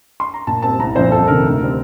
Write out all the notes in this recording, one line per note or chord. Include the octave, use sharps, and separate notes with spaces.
C6
A#5
A#2 A5
G3 C4 A5
C2 A#5
A#2 F3 C4 C5
F2 A4
C3 D#3 A#4
D2
D3 G3 C4